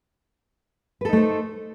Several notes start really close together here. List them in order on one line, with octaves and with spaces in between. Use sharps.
B4 A4 D#4 A3 C5